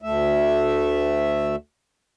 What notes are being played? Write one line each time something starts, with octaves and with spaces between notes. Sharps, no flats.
D2 A3 E5